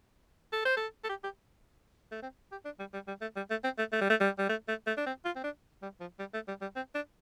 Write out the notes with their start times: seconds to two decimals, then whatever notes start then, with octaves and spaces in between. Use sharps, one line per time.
0.53 A4
0.65 C5
0.77 A4
1.04 A4
1.10 G4
1.24 G4
2.12 A3
2.23 C4
2.52 G4
2.65 D4
2.80 G3
2.94 G3
3.08 G3
3.22 A3
3.36 G3
3.50 A3
3.64 C4
3.78 A3
3.93 A3
4.01 G3
4.10 A3
4.21 G3
4.39 G3
4.50 A3
4.68 A3
4.87 A3
4.97 D4
5.06 C4
5.25 F4
5.36 C4
5.44 D4
5.82 G3
6.00 F3
6.19 G3
6.34 A3
6.48 G3
6.62 G3
6.76 C4
6.95 D4